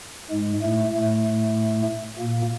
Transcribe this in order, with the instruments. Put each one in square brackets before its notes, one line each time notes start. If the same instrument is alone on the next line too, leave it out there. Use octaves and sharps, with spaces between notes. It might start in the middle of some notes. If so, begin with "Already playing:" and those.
[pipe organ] G#2 G#3
A2 A3
A2 A3
A#2 A#3